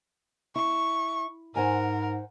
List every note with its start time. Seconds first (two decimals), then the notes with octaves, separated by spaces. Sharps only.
0.56 E4 C#6
1.56 G#2 A#4 C5 F#5 G#5